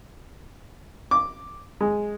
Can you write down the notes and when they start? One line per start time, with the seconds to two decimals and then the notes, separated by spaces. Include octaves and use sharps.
1.11 D6
1.81 G#3